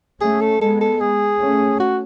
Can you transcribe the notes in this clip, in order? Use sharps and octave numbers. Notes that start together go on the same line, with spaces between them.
A3 C#4 G#4
A4
G#3 B3 A4
A4
G#4
A3 C#4
F#4